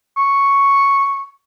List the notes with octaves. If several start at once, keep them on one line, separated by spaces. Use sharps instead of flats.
C#6